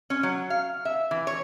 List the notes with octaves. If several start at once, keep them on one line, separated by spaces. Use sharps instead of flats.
C#4
F#3
F5
E5
E3
C#5